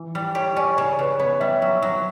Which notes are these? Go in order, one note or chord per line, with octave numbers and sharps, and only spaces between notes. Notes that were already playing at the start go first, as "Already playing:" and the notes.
Already playing: E3
G3
G4 C#5
C#4 D5
C#3 C#5
C#3 B4
B3 C#5
G3 E5
F#3
F#3